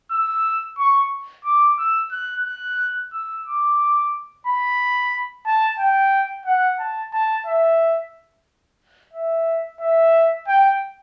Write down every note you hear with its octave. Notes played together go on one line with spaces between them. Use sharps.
E6
C#6
D6
E6
F#6
F#6
E6
D6
B5
A5
G5
F#5
A5
A5
E5
E5
E5
G5